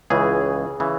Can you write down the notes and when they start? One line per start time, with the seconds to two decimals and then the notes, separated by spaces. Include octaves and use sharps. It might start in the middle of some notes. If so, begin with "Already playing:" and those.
0.10 C#2 C#3 E3 G#4
0.80 C#3 E3